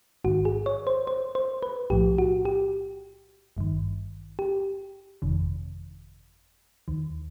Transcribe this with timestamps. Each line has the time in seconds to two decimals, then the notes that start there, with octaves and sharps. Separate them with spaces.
0.24 A1 G#2 D#3 F#4
0.45 G#4
0.66 C#5
0.87 C5
1.07 C5
1.35 C5
1.63 B4
1.90 B1 A2 F3 G4
2.18 F#4
2.45 G4
3.57 G#1 G2 D#3
4.39 G4
5.22 G1 F2 C3 D#3
6.88 D#2 D#3